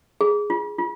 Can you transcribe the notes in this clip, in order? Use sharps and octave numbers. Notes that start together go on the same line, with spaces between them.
G#4
F4
F4